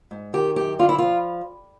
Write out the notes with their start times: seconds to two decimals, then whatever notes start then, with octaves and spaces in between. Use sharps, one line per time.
0.11 G#2
0.33 D#3 G4
0.56 F#2 G4
0.79 D3 F4
0.89 E4
0.98 F3 F4